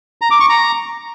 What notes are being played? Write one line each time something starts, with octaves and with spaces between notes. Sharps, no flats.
A#5
D6
C#6
A#5